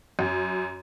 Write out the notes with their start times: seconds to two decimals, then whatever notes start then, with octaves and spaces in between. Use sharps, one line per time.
0.19 F#2